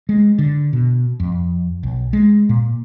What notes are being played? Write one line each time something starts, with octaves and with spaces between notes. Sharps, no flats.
G#3
D3
B2
F2
B1
G#3
A#2